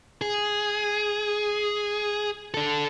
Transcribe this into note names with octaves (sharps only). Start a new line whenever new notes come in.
G#4
D4 A4